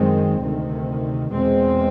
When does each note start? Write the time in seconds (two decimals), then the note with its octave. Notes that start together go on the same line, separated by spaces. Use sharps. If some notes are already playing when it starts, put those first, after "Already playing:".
Already playing: F#2 D#3 G#3 C4
0.41 D2 C3 D#3
1.33 E2 B2 G#3 C4